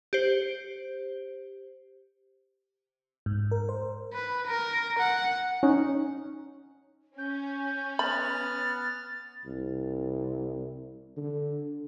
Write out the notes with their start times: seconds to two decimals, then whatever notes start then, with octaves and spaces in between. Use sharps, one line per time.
0.13 G4 C5
3.26 G#2
3.51 A#4
3.69 C5
4.14 B4
4.47 A#4
4.99 F#5
5.63 C#4 D#4
7.18 C#4 G6
7.99 B3 B5 F6 A6
9.46 C2
11.16 D3